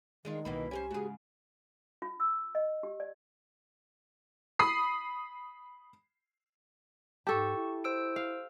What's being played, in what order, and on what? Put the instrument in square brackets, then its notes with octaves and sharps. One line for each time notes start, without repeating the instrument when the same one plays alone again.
[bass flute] D#3 [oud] G#3 D4 F4
[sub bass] C2 [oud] B2 E3 A#3 [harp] B5
[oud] C#4 A#4 C5 [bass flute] G4 [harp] G#5
[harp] G#2 C#3 [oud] F#4 G#4
[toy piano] F4
E6
D#5
G4
D5
[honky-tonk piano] B5 D#6 C7
[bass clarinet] G#2 [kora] G4 A4 [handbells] A5 C#6
[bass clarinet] E4
[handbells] C5 E6 D7
[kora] F5